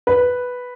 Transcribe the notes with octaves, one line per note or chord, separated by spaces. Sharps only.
B4